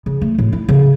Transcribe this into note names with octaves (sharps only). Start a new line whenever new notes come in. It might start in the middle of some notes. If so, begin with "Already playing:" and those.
C#3
A3
A2
E4
C#3